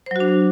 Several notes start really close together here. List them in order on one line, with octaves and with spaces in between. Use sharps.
C5 F#3 F#4 D4